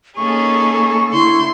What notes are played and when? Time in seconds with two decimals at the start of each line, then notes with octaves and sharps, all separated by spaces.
0.17 A#3 C#4 D#4 G#4 A4 C#6
1.13 D3 E4 C6 G6